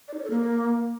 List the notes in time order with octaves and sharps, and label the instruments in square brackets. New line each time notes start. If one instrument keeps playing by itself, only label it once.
[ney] D5
D#4
C#5
A4
A#3